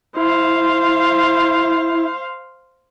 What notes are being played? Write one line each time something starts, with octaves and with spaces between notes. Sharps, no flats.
E4 C5 F5